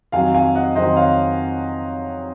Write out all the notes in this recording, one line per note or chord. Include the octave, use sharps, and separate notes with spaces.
F2 D#3 F#3 F5 G#5
F5 G#5
D#5 F#5
F2 D#3 F#3 C5 D#5
C#5 F5